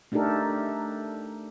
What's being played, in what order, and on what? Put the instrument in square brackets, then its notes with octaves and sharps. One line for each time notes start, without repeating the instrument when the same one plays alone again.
[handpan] A3 D4 D#4 G4 A4 A#4